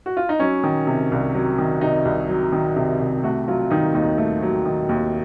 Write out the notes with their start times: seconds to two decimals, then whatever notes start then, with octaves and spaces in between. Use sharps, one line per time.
0.06 F#4
0.17 F4
0.29 D#4
0.40 F#3 C#4
0.64 D#3
0.87 C3
1.12 C2
1.35 F#3
1.58 D#3
1.81 C3 D#4
2.05 C2
2.29 F#3
2.53 D#3
2.76 C3
3.00 C2
3.23 A3 F#4
3.48 F#3 F4
3.70 D#3 D#4
3.94 D#2 D#4
4.18 A3
4.42 F#3
4.66 D#3
4.89 D#2